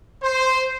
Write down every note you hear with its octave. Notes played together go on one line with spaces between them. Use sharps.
C5